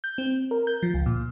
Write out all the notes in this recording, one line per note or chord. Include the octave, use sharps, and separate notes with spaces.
G6
C4
A#4
G6
F3
C#2
A#2